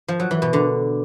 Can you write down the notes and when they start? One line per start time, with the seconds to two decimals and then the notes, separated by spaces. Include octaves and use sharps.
0.08 F3
0.20 F#3
0.31 E3
0.42 B2
0.53 D3